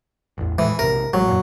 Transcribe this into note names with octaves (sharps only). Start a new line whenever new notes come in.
A1 E2
D#1 A2 E3 G#3
B1 G#2 C3 A#4
A1 F#3 G#3
F#2 A#2